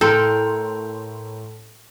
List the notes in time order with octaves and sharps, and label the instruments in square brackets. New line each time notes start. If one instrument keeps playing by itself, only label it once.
[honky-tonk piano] A2 C6 [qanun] A4 [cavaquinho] A#4 G5